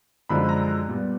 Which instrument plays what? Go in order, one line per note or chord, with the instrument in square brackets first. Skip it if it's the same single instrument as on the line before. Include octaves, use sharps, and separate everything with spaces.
[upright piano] F#2 D3 F3 G#3 B5
A#5
A#2 G3 B3